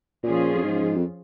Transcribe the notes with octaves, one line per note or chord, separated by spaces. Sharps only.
A#2 F3 C#4 F4 G#4
F2
G#2
F2